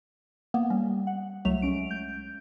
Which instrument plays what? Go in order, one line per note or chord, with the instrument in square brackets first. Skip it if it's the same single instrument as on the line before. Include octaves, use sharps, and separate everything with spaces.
[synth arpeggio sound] A#3 B3
[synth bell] G3 [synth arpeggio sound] C#4
[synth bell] F#5
[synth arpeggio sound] C2 F#3 A3 [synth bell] E5 F7
[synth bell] G#3 C#4 D7
G6